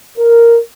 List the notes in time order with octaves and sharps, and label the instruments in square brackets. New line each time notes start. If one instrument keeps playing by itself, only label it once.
[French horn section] A#4